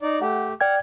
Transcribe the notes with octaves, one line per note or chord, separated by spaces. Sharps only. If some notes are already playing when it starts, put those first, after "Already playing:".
D#4 D5
A3 G4 F#5
D5 F#5 G5 F6 G#6